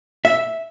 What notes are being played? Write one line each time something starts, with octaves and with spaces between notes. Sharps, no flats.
E5